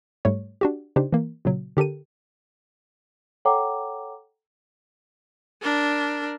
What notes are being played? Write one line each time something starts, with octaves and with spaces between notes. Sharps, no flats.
G#2 G3 A3 C#5
D4 F#4 G4
C#3 D4 D#4 G4 C5
E3 A#3
A#2 C#3 F#3
D3 G4 A4 A#4 D#7
A4 C#5 F#5 G5 A#5 D6
D4 A#4